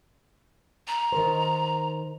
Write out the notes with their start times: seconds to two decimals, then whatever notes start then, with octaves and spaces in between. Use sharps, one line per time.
0.87 A#5
1.12 D#3 A#4 C5